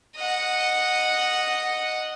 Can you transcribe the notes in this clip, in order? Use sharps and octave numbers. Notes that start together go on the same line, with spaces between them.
D#5 F#5